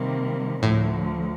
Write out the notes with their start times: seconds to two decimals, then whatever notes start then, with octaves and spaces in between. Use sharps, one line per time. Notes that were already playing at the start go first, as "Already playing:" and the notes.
Already playing: C3 D#3 G3 A#3
0.63 D2 A2 D3 F3